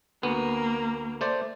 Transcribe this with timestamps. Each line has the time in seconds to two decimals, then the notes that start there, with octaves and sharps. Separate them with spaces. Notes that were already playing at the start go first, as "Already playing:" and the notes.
0.23 D2 A#3 B3
1.21 A3 C5 D5